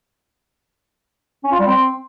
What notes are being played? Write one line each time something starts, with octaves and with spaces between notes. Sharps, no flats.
C#4
F4
G3
C4